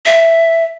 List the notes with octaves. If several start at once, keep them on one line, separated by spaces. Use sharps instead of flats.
E5